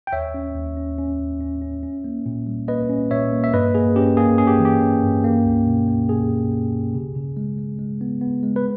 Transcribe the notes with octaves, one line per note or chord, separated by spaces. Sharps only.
G5
D#2 C#5 E5
C#4
D#2
C#4
C#4
D#2
C#4
C#4
C#4
A#3
A#2
G3
A#3 B4 D#5
C#4
A#2 C#5 E5
A#3
E5
G2 B4 D#5
A#3 G#4
C#4 G4
A#3 G#4
C#4 G#4
G4
E3
G4
C#4
G2
A#3
C#2
B2
A#3
B2 G#4
C#2
A#3
C#2
C#3
C#3
G#3
G#3
G#3
B3
B3
G#3
B4